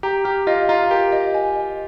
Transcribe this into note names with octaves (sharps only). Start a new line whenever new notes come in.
G4 A#5
G4 F6
F4 D#5
F4 A#5
G4 A#4
D#5
G#5
D#5